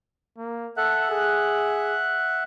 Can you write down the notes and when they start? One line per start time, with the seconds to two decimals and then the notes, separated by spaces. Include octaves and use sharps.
0.38 A#3
0.77 A4 E5 F#5 F#6
1.10 G#4